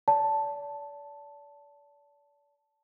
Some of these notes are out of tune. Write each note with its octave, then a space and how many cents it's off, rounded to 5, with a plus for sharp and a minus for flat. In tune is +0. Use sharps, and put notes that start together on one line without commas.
D5 -35 A5 +0